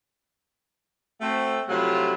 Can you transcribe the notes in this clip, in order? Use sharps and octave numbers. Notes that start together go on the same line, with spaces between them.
A3 C4 F#4
C3 F3 F#3 A3 E4 F4